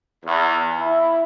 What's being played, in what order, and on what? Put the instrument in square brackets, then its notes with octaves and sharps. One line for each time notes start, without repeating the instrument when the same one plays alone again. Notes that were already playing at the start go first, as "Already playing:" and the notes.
[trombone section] E2
E4